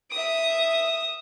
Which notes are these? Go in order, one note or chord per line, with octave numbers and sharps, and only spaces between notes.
E5 D#6